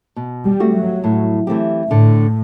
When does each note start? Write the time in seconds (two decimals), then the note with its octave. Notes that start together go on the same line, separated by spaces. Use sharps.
0.16 B2
0.46 G3
0.60 A3 C4 F#4
0.74 F#3
1.04 A2
1.47 E3 A3 C4 G4
1.90 A2 D3